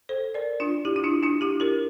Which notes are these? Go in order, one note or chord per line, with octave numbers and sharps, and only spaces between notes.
A4 C5
A#4 D5
D4 F4
E4 G4
E4
D4 F4
D4 F4
E4 G4
G4 A#4